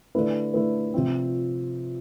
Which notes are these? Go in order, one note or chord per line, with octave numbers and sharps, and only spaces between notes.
D3 A3 E4 B4
D3 A3 E4 B4
C3 F3 C4